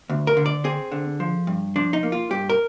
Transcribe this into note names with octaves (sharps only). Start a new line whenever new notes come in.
D2
A#4
D3
D5
C4 G#4
D3
F3
G2
F3 D4
D#4
A#3
F4
G2 G4
A#4